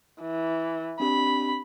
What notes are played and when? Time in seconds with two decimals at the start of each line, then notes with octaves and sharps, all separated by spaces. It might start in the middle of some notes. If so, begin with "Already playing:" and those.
0.21 E3
1.00 C4 D4 G4 B5